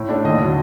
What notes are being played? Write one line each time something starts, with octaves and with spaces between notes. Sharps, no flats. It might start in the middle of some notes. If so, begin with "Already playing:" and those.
Already playing: A2
A3 D4
D#2 D#5
D3 F#3